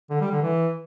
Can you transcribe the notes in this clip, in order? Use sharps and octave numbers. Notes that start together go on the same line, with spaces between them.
D3
G3
D3
E3